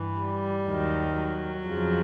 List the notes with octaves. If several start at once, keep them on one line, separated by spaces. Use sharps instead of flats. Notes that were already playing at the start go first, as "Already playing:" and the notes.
Already playing: G2 E3
G3
D#2 D#3 F#3
F#3
F2 C#3 F3